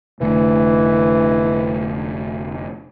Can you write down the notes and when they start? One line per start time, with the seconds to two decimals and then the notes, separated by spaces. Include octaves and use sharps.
0.21 F1 D3 E3 A3